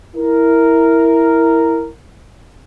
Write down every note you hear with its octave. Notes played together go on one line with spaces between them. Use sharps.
E4 A#4